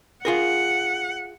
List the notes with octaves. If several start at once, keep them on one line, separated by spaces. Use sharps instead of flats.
F4 G#4 A#4 F#5